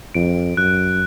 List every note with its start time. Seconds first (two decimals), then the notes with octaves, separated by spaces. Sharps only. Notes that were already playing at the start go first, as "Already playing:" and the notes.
0.14 F2 D7
0.57 F#2 F#6